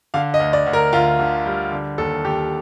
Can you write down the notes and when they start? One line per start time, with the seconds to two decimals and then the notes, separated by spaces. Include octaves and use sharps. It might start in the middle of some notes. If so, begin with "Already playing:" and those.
0.14 D3 F5
0.34 D#5
0.40 D2
0.53 D5
0.67 D2
0.73 A#4
0.93 D2 F4
1.19 D3
1.45 G3
1.72 D3
1.98 D#2 A4
2.25 D#2 G4